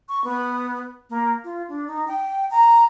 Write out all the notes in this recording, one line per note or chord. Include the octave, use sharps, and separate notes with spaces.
C#6
B3
A#3
F4
D4
D#4
G5
A#5